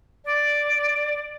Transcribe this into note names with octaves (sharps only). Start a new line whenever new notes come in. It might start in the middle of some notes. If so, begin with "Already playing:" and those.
D5